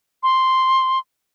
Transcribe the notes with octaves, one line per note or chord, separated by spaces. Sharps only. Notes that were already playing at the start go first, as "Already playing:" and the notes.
C6